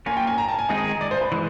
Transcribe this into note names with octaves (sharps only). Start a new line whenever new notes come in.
A#3 C#4 F4 G#5
G5
G#5
A#5
A5
G#5
D#3 G#3 C4 D#4 G#4 D#5
D5
C5
B4
E3 G#3